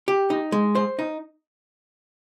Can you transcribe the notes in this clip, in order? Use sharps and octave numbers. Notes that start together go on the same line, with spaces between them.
G4
D#4
G#3
C5
D#4